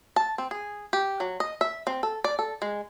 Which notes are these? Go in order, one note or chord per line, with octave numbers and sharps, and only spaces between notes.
A5
C4
G#4
G4
F#3
D#5
E5
C4
A4
D5
A4
G#3